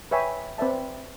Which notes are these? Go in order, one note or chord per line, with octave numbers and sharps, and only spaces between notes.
B4 C#5 E5 G5 G#5 B5
C4 B4 D5 E5 A5